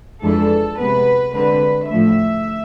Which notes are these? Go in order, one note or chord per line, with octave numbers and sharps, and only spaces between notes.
F2 E3 G#3 D4 A4
C3 G#3 B3 B4
D3 G#3 C4 B4
A2 F3 A3 E5